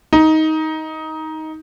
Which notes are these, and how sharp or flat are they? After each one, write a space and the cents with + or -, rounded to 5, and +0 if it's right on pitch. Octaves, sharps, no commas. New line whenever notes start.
D#4 +15